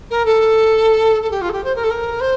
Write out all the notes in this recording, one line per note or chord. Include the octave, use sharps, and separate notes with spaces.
A#4
A4
A4
G4
F4
A4
G4
C5
A#4
A4
A#4
C5